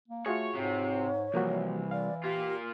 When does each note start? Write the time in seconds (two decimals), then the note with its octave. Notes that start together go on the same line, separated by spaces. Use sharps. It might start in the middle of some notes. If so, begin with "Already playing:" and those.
0.08 A#3
0.26 A3 F4 F#4 G#4 C#5
0.55 G#2 C3 C#5
1.34 C2 E3 F3 A#3 F#4
1.91 D5 F5
2.24 A#3 F4 G4